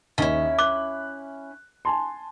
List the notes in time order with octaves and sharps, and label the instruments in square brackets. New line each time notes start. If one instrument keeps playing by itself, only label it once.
[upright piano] D#2 D#5 [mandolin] C#4 E4
[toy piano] D6 [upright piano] F#6
[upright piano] G#5 A5 C6